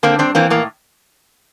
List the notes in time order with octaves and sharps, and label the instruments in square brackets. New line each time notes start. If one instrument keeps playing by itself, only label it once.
[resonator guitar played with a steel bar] D3 A#3 C4
G2 C4 D4
E3 A#3 C4
A2 A#3